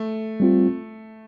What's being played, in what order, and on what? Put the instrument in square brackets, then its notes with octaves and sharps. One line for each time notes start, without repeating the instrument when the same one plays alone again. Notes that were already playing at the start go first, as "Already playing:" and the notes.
Already playing: [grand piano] A3
[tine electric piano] G3 C4 F4